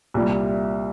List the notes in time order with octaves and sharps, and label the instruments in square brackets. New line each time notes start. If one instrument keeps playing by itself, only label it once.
[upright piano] C2 A#2 G3